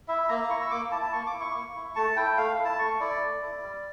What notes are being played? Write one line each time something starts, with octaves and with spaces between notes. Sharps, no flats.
E4 E5
A#3 A#5
E4 C#6
E6
A#3 D6
E4 A5
A5
A#3 C#6
D6
E4
C#6
A#3
E4
A3 A5
E4 G5
A3 F5
E4
A5
A3 C#6
E4 D5
A3
E4
G3